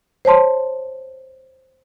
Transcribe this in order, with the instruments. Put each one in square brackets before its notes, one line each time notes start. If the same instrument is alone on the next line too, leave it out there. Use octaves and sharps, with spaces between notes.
[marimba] C5 C#5 A5 C6